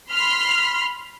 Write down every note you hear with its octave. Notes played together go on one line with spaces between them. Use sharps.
B5 C6 F6 B6 C7